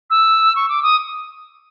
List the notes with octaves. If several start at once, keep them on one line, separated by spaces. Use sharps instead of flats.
E6
C#6
D6
D#6